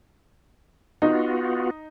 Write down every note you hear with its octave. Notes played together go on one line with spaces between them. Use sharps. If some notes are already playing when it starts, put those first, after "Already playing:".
B3 D#4 F4 F#4